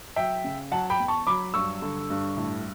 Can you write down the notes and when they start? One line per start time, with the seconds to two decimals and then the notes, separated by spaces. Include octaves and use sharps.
0.16 F#3 E5 G5
0.44 C#3
0.71 F#3 F#5 A5
0.90 G5 B5
0.99 E2
1.08 A5 C#6
1.27 F#3 B5 D6
1.54 G2 C#6 E6
1.82 D3
2.10 G2
2.37 A2